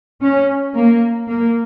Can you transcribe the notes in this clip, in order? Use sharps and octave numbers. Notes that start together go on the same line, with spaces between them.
C#4
A#3
A#3